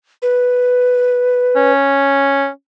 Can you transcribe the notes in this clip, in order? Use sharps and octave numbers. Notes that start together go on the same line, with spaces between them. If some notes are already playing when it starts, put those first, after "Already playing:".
B4
C#4